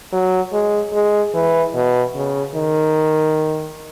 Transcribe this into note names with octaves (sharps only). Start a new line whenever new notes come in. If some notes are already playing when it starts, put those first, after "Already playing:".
F#3
G#3
G#3
E3
B2
C#3
D#3